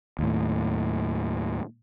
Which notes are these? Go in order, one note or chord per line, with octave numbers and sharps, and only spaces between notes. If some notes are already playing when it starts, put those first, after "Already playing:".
D#2 A2